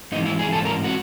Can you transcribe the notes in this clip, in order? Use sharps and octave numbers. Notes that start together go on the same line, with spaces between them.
G#2 E3 D#4
E4
G#4
G#2 E3 A4
A#4
F#4